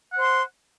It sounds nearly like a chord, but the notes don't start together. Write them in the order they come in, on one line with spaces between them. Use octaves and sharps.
F#5 C5 C6